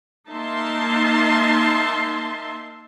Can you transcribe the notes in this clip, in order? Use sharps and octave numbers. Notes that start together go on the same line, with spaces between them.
A#3 D#4 E5 A5 C6